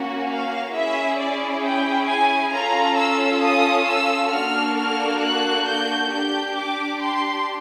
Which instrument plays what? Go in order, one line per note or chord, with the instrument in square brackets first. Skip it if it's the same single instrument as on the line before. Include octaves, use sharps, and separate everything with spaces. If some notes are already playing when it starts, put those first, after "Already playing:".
Already playing: [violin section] A#3 C#4 F#4
F5
C#4 E4 G#4 E5
D5
G5
G#5
C#4 F4 A4 A#5
E6
D#6
E6
A#3 D4 F#4 A4 F6
F6
F#6
G6
D4 G4 G6
D6
C6